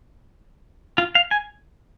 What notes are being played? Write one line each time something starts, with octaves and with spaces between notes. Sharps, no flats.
F4
F5
G#5